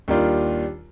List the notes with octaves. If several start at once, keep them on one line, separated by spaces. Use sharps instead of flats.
D#2 D#3 G3 D4 F4